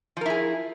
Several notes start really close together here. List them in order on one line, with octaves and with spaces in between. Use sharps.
F3 A#4 E4 G#4